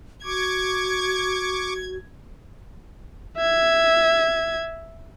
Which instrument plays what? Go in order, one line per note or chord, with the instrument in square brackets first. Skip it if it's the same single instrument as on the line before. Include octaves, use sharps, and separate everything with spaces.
[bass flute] F#4 [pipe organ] C#6 D6 [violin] G#6
[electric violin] E5 G#6